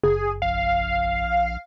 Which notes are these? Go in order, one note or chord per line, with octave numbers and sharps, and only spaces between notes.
F#1 G#4
A#1 F5